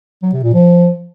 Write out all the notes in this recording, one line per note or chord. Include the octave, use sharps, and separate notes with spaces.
F#3
C3
A#2
F3